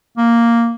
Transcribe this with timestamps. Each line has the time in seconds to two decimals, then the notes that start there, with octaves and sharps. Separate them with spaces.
0.18 A#3